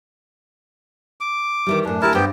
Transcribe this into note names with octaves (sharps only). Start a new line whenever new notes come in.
D6
D#3 E3 G3
F#2 A2 D4
D2 E4 G4 A#4 G#5 A5
G2 B3 G4 C5 G5